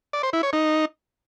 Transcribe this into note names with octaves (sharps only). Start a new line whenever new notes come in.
D5
C5
E4
C#5
D#4